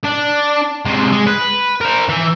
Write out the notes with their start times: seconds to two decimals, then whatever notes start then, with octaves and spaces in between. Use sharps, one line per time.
0.04 D4
0.85 C3 G#3
1.12 G#3
1.27 B4
1.81 A#4 C5
2.09 E3